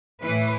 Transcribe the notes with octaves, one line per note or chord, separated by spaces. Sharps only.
A2 E3 B4